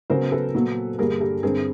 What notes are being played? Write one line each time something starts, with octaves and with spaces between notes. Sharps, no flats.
C#3 F#3 B3 A#4 C5
A4 B4
A#2 F#3 B3
G2 D3 G3 A#3 G#4 A#4
G4 A4
G2 D3 G3 C4 G#4 A#4